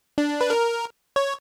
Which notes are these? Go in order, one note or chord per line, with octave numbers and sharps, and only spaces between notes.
D4
B4
A#4
C#5